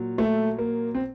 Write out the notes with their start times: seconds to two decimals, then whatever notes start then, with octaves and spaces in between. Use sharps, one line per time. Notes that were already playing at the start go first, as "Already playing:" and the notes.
Already playing: A#2 F#3
0.18 A3
0.59 A#3
0.95 C4